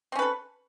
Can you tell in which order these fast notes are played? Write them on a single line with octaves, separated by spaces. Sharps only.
C4 C#4 B4 A4